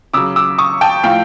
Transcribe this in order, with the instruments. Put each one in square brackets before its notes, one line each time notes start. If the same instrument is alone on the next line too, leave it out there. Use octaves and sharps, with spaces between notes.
[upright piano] C#3 F#3 D6 E6
D6 E6
C#6 D#6
G5 A5
A2 F3 F5 G5